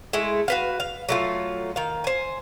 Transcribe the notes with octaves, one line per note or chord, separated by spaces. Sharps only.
G#3 A3 E4
F#4 B4 F5
F5
F#3 A3 F4
D#3 F5
C5 G#5